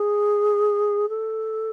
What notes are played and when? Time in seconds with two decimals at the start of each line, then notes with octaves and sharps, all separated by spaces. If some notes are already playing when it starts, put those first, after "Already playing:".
Already playing: G#4
1.09 A4